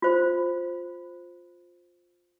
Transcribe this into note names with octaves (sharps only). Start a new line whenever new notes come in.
F4 C5